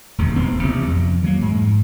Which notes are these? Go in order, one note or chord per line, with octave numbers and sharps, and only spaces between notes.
E1 D#2 C3
E1 A1 B3 C4
A1 C3
F2
E3 F#3 A#3
G#2